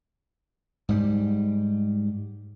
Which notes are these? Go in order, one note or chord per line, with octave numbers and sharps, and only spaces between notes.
G#2 G3